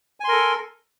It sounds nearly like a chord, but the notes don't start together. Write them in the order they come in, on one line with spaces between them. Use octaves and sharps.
G#5 C6 A#4 A4